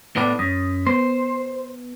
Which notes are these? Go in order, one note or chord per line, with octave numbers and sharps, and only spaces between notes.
A2 B3 D4 B5 D6 E6
F#2 D#6
B3 C5